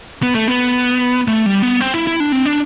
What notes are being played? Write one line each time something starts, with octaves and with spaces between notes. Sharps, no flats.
B3
A3
B3
A3
G3
B3
C4
E4
E4
D4
C4
D4